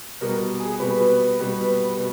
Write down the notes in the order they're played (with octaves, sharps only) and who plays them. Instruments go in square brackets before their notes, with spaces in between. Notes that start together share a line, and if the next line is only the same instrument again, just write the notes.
[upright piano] B2 G3 B3 [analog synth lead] A#4
[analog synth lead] G#4
[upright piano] B2 G3 B3 [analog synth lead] B4
[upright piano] B2 G3 B3
B2